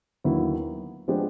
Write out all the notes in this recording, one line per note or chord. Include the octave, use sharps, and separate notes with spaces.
D#2 D3 F#3 B3 E4
F3 G#3 B3 D4 G4